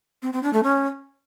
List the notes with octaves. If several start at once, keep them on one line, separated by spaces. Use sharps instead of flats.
C4
C4
D4
A3
C#4